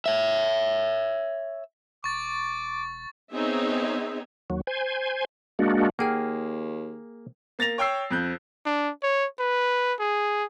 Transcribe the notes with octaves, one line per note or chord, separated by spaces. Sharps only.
C#5 E5
E1 C#6 D6 A6
B3 C4 D#4 G#4 C#5 E5
D#2 F#3
C5 G#5
G#3 A#3 D4 F#4
D#2 A#3 G#4 F#5 G5 F6
A#3 A6 A#6 F7
C#5 G5 E6 C7
F2 F#6 G6
D4
C#5
B4
G#4